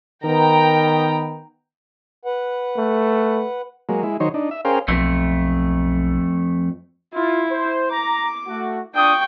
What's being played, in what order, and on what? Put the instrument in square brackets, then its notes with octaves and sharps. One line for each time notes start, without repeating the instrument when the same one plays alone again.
[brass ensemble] D#3 B3 [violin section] G5 A#5
[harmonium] B4 F#5
[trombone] A3
[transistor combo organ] F#3 G#3 A#3
G#3 E4
D#3 F#3 D#4 C5 C#5
D4 D#4
E5
C#4 G#4 A#4 C5 F5 G5
[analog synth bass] B1 [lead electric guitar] F2 A3
[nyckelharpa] E4 [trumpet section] F4
[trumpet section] C5
[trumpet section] A#5 [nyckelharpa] D6
[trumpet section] A3 F#4
[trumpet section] D4 F4 D#6 [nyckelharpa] G5 C#6